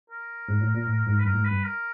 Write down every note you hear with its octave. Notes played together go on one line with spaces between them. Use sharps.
A#4
G#2
A2
A#2
A2
G#2
B4
G2 A#4
A2
G#2
B4
G2
A#4